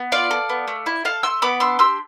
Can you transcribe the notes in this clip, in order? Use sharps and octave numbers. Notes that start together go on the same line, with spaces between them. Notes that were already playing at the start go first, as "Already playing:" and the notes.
Already playing: B3
F4 D5 F5
A4
B3
A3
E4
A4 F5 A5
A3 C6 E6
B3 B5 D6
D4 C6 E6
G4 C6 E6